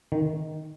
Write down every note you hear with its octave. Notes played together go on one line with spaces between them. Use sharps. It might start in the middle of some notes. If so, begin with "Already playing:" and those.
D#3